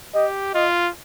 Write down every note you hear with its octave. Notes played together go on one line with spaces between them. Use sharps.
G4 D#5
F4 D#5